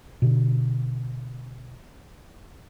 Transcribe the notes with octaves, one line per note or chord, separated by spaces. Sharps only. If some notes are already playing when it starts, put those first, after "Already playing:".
B2 D3